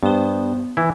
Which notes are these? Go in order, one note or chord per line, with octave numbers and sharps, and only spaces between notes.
G2 B3 C5
E3 E4